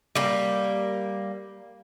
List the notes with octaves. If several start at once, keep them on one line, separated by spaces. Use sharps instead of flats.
G3 A#3